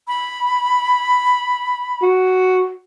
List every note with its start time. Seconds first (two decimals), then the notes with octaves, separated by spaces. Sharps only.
0.08 B5
2.02 F#4